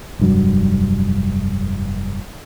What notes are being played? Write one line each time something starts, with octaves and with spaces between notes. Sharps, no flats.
F1 G2 F#3